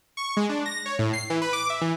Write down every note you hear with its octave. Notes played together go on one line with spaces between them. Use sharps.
C#6
G#3
D4
A#6
C#5
A2
C7
E3
B4
D6
E5
E3